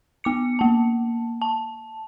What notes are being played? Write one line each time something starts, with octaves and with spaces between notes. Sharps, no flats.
B3 D6 C#7
A#3 A5
A5